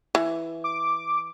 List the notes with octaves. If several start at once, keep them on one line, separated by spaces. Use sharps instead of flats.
E3
D6